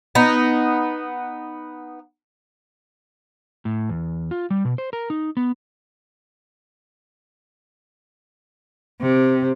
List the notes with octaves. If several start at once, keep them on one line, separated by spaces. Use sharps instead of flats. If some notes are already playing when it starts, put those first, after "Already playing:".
B3 D#4
A2
E2
F4
G3
B2
C5
A#4
D#4
B3
C3